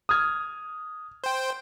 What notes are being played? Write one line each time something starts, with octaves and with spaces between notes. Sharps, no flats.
D#6 F6 G#6
C5 G5